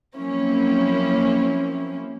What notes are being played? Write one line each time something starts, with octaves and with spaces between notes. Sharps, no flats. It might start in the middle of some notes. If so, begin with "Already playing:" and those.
F3 F#3 A#3 C4 C#4 E4